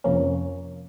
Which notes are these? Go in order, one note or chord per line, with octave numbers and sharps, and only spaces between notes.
F2 C3 F3 A#3 C#4